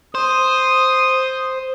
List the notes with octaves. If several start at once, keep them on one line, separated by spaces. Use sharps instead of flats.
C5 D#6